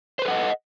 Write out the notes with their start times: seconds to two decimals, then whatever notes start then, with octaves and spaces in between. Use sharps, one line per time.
0.19 C5
0.22 B4
0.25 A4
0.28 F#5
0.31 D#5